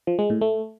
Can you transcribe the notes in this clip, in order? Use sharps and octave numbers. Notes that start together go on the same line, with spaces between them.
F3
G#3
A2
A3